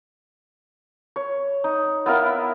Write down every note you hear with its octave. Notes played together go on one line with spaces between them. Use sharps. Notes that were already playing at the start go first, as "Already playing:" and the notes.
C#5
D#4
B3 E4 A#4 F5